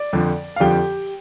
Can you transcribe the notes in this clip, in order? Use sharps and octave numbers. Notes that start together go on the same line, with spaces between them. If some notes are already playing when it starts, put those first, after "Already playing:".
Already playing: D5
F2 D3 F3
F5
F2 D3 F3 G4 G5